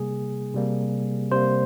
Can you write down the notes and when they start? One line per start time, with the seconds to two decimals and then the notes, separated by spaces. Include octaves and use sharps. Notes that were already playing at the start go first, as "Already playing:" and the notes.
Already playing: C3 G3 A#3 G#4
0.54 C3 G3 A#3
1.31 C3 G3 A#3 C5